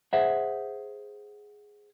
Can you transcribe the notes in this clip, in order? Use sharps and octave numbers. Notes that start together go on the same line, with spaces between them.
G#4 C5 E5 F#5